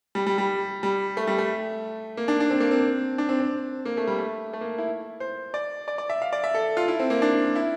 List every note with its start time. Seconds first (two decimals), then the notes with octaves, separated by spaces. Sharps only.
0.15 G3
0.26 G3
0.38 G3
0.83 G3
1.17 A3
1.27 G3
1.38 A3
2.17 A#3
2.28 D4
2.40 D4
2.50 C4
2.60 A#3
2.71 C4
3.18 D4
3.29 C4
3.40 C4
3.85 A#3
3.97 A3
4.07 G3
4.19 A3
4.53 A3
4.61 A#3
4.78 E4
5.20 C5
5.54 D5
5.88 D5
5.98 D5
6.10 E5
6.22 F5
6.33 D5
6.44 E5
6.54 A4
6.77 F4
6.88 E4
6.99 C4
7.10 A#3
7.22 D4
7.55 E4